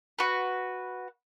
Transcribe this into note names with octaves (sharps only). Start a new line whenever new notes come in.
F#4 B4